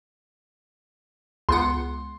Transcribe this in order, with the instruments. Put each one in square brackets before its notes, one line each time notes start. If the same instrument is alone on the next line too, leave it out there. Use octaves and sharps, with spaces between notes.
[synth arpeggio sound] C#2 B3 F#5 [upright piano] C6